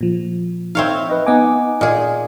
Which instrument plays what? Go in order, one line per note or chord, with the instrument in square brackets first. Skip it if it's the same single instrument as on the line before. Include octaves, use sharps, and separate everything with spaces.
[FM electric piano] A#2 F3
[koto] C4 C#5 F5 [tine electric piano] D#4 E5
[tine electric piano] B4 D#5
[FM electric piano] B3 D#5 D6 [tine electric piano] D#4 F#5 G#5
[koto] A#2 G#4 [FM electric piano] D#5